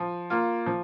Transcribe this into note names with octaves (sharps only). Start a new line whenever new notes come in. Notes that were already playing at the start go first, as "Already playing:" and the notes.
Already playing: F3
A#3 F4
F3